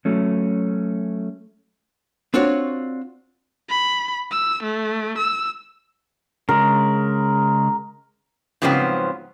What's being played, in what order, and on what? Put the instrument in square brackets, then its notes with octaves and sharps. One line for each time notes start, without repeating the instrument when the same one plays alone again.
[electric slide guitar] F#3 A3 C#4
[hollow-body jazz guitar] C4 D4 F4 F#4 C#5
[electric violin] B5
E6
A3
E6
[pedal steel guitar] C#3 G#3 [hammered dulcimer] A#4
[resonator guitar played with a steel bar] G#2 C#3 F3 F#3 B3 C4